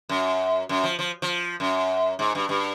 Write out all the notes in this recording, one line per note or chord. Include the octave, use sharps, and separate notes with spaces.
F#2
F#2
F3
F3
F3
F#2
G#2
G2
G2